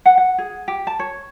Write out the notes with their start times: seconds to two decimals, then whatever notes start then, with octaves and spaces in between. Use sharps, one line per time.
0.06 F#5
0.18 F#5
0.38 G#4
0.68 G4
0.87 A5
0.99 C#5